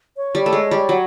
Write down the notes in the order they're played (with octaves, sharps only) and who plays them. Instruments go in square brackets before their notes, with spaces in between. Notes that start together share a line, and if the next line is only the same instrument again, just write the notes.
[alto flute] C#5
[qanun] G3
A3
G#3
G3
F#3